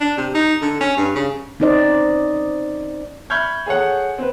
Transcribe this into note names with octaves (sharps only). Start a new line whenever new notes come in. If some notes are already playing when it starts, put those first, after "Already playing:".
D4
C3
D#4
D3
C#4
G2
C#3
C4 C#4 D#4 C5 D5 D#5
E5 B5 C#6 F6 G6 G#6
G#4 A4 C#5 F#5
C4 B4